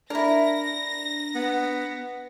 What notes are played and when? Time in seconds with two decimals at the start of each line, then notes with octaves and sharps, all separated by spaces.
0.10 D4 E4 A#4 A#6
1.35 B3